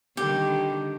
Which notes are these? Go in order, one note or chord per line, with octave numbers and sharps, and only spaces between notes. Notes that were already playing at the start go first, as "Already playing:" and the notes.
D3 D#3 G3 G4